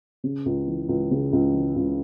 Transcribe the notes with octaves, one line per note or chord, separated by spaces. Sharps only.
C#3
C#2
E3
C#2
C#3
C#2
E3
C#2